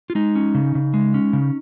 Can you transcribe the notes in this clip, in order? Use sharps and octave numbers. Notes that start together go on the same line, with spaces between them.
F4
G#3 D#4
C#4
C#3
C#3
G#3
C#4
C#3